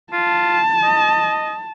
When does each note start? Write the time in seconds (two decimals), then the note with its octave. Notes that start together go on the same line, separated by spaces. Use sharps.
0.13 F4 A5
0.83 D#5